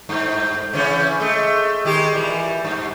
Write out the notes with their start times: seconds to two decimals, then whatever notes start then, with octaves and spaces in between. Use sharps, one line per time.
0.09 G2
0.73 C#3 E3 C#4
1.20 G#3 A3
1.85 D#3 G#3 G4
2.13 A#2 E3 G3
2.65 G2